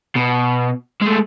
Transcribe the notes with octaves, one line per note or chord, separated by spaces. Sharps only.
B2
G#3 A3